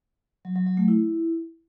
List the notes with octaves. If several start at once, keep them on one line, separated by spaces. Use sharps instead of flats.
F#3
F#3
F#3
A3
E4